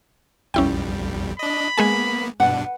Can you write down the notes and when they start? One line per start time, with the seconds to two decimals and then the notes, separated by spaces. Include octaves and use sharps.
0.54 B1 F2 G3 C#4 E4 G5
1.39 D4 D#5 B5
1.78 G#3 A#3 B3 G#4 G#5
2.40 G2 B2 D4 B4 F#5